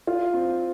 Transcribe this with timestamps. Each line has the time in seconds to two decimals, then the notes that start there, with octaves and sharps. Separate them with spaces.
0.07 F4
0.34 C4